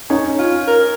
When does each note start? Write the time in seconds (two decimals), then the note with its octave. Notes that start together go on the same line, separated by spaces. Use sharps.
0.10 C#4 D#4
0.39 F4
0.68 A#4